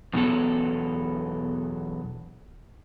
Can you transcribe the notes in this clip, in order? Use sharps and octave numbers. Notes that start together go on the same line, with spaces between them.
E2 B2 D#3 F#3 B3 A4